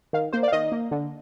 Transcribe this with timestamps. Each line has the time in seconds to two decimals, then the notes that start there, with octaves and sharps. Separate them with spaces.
0.13 D#3 F5
0.33 A#3 C5
0.43 D5
0.48 F5
0.52 D#3 D#5
0.72 A#3
0.91 D3